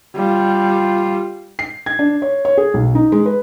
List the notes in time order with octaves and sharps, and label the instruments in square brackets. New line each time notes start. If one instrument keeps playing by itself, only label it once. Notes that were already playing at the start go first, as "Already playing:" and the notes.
[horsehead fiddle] G3 F4
[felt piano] C7
G#6
D4
C#5
C#5
G#4
B1
D#4
G#3
B4